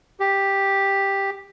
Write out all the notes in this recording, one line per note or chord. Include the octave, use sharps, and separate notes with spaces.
G4